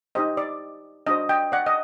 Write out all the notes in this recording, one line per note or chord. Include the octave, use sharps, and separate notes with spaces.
D#4 G4 C5 D#5
D5
D4 F#4 C5 D#5
D#5 G5
D5 F#5
D#5